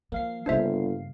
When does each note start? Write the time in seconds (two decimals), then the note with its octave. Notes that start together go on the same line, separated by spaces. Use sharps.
0.12 F3 A#3 F5 C7
0.46 G1 G2 C#3 D4 C5 E5